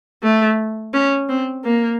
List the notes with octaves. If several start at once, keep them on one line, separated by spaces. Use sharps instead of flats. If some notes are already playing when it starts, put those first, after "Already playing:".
A3
C#4
C4
A#3